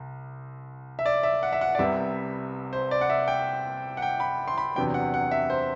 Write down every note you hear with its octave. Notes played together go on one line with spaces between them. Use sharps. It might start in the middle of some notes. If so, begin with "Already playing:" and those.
Already playing: C2
E5
D5
E5
F#5
E5
F#5
D5
C2 C3 G3 B3 E5
C5
D5
F#5
E5
G5
F#5
G5
B5
C6
B5
E2 C3 F#3 B3 D4 G5
F#5
F#5
E5
C5